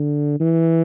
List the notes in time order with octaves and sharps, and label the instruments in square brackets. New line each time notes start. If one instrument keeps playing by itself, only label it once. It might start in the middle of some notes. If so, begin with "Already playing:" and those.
Already playing: [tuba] D3
E3